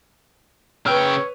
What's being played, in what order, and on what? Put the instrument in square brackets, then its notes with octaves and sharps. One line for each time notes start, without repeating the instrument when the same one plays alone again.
[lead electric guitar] C#3 G5 [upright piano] B4 F6 [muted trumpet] C#5 [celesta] E6